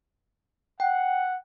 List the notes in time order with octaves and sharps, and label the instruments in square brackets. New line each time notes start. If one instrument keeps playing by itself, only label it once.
[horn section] F#5 [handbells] G5